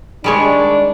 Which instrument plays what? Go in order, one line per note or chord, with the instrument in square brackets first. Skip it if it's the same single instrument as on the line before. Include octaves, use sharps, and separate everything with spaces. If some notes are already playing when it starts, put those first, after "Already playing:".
[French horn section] D#3 D4 [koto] G3 G#3 C#5